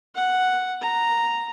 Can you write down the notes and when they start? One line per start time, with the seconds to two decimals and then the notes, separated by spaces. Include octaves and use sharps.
0.15 F#5
0.82 A#5